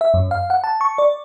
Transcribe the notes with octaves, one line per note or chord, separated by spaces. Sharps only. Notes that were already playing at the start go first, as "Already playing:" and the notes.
E5
F#2
F5
F#5
A5
C#6
D5